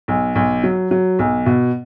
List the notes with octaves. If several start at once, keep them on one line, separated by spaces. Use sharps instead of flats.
B1
B1
F#3
F#3
B1
B2